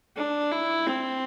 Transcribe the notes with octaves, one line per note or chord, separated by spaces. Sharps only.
D4
E4
C4